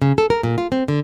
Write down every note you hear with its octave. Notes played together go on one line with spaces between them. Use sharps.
C#3
A4
A#4
A#2
F4
C4
D3